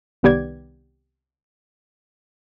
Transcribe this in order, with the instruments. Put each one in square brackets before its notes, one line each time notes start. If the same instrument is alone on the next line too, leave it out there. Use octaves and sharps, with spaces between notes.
[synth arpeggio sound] C2 D#3 B3 G4 D5 G#6